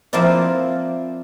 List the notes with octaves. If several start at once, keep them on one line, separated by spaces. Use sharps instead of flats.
F3 A#3 C4 E4 D5